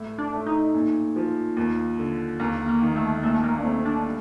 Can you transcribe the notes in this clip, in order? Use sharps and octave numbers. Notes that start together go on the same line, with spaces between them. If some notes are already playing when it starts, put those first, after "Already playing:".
Already playing: A2
D4
A3
D#4
A#2
F3
D#2
D3
D#2 A#3
A#3
D#3
A3
A#2 A3
A#3
D4
A3 C4
D4
G3